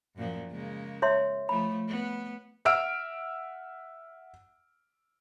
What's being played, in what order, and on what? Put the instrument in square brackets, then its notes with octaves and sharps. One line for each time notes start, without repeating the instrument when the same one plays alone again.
[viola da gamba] F#2 A#2 F3
C#3 G#3 A#3
[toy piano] C#5 E5 C6
[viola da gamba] F3 A3 [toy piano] B5
[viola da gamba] B3
[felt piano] E5 F#5 E6 F6 D7